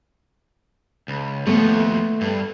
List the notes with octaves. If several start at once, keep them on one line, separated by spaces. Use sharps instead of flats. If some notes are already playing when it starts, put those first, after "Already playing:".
C#2
D#2 F3 A3 B3
G2